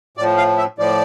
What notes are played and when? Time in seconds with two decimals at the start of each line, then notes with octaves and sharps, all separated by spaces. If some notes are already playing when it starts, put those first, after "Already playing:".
0.17 A2 D5
0.20 F3
0.37 F5
0.58 E5
0.78 A2 F3 D5